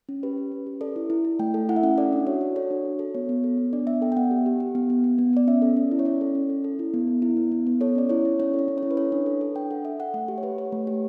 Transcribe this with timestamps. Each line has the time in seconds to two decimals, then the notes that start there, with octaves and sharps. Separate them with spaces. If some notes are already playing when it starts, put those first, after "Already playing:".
0.09 C#4
0.23 G4 B4
0.37 C#4
0.52 C#4
0.67 G4
0.81 A4 D5
0.96 E4
1.10 E4
1.25 E4
1.39 A3 G5
1.54 A4
1.69 E4 F#5
1.76 E5
1.83 C#4 F#5
1.98 A4 D5
2.13 D4
2.27 F#4 C#5
2.41 F#4
2.56 A4 C#5
2.71 D4
2.85 F#4
2.99 A4
3.14 B3 C#5
3.29 B3
3.44 A4
3.58 B3
3.73 D4 D5
3.87 B3 E5
4.02 A4 G5
4.12 G5
4.16 B3 F#5
4.31 G4
4.46 G4
4.60 G4
4.75 B3
4.90 B3
5.04 B3
5.18 B3
5.33 B3 D5
5.47 C#4 E5
5.62 A4
5.77 C#4
5.91 E4
5.99 C#5
6.05 C#4 D5
6.21 A4
6.35 C#4
6.50 A4
6.64 A4
6.79 E4
6.94 B3
7.08 A4
7.22 E4
7.37 B3
7.52 B3
7.67 B3
7.81 A4 C#5
7.95 C#4 D5
8.09 E4 C#5
8.25 E4
8.40 C#4 C#5
8.54 A4
8.59 C#5
8.68 C#4
8.78 E4 C#5
8.91 B4
8.97 A4 C#5
9.12 D4
9.26 A4
9.41 A4
9.55 D4 G5
9.71 A4 F#5
9.85 A4 E5
10.00 A4 F#5
10.14 A3 F#5
10.28 G4
10.38 C#5
10.43 G4 B4
10.58 G4 C#5
10.72 A3
10.87 G4